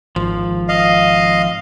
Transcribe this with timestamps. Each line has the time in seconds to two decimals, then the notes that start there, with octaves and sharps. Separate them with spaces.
0.16 G#1 F3
0.69 D#5 F5